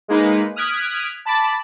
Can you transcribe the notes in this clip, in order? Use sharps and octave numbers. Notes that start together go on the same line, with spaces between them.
G#3 A#3 D#4 B4
D#6 F6 F#6 G#6 B6 D7
A5 B5 D6 A6